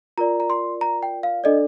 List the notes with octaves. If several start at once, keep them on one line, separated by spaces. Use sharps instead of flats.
F4 A#4 D5 A#5
A#5
C6
A#5
G5
F5
D4 A4 D5 D#5